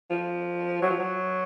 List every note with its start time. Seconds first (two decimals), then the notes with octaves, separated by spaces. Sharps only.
0.10 F3
0.82 F#3
0.90 F3
0.99 F#3